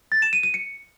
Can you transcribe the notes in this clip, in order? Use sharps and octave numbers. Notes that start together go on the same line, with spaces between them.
A6
E7
D#7
D#7
C#7